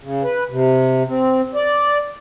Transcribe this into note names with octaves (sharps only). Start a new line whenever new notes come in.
C#3
B4
C3
C4
D5